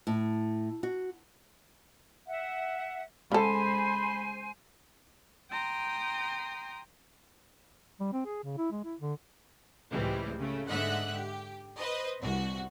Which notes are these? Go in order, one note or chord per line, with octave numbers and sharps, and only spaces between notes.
A2
F#4
E5 F#5
C#3 G#3 A4 C5 G#5 B5 C6
G5 A#5 C6 D#6
G3
C4
G#4
C#3
E4
G#3
E4
D3
C#2 A2 E3 G3 G#3 C4
C#3 A3
G#2 D3 D#5 E5 F#5 F#6
G4
B4 C5 D#5
C2 F#4